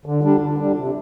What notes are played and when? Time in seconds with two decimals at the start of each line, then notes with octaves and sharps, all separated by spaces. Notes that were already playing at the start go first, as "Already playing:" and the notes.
0.06 D3
0.23 G3 D4
0.41 D3
0.58 G3 D4
0.77 C3